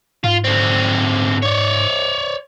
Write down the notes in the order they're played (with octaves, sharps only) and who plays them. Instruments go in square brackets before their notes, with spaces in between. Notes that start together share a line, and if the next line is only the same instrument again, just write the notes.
[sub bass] G#2 [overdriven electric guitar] F4
[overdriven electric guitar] D3 C4
C#5 D5